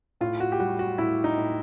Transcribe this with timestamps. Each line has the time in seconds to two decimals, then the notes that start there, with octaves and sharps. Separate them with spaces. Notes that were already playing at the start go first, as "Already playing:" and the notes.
0.21 A2 F4
0.40 F#4
0.52 G4
0.60 G3 F#4
0.79 F#4
0.98 A2 E4
1.24 D#4
1.38 A2